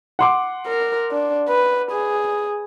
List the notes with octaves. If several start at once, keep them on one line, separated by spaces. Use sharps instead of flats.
F#5 C6 D6
A#4
D4
B4
G#4